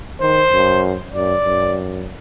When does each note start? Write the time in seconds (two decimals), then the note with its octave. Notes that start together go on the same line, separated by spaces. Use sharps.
0.21 D#3 C5
0.52 F#2
1.14 F#2 D5
1.44 F#2